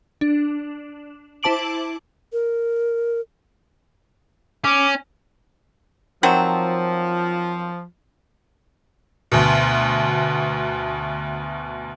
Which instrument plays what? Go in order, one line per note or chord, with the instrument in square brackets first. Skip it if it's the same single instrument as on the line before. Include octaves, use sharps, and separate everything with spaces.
[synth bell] D4
E4 C5 A5 D6 D7 F#7
[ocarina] A#4
[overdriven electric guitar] C#4 [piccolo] D6
[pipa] D#3 F#3 C4 [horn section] F3
[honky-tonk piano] D2 B2